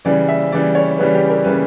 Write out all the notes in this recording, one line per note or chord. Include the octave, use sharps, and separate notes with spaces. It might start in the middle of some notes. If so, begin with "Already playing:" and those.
C#3 E3 G3 D5
E5
C#3 E3 G3 D5
C#5
C#3 E3 G3 B4
G4
A#4
C#3 E3 G3 B4